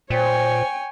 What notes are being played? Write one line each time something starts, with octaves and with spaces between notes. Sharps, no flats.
A#2 C5 C#5 G5 G#5